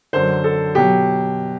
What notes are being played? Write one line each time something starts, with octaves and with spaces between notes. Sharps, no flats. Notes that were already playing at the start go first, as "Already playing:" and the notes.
F#2 D3 F#3 C5
A4
B2 F#3 G4